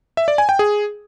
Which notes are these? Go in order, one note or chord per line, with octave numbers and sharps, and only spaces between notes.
E5
D5
G#5
G5
G#4